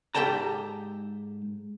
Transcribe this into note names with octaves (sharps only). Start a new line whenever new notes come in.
G#2 G4 A4 G5 A5 A#5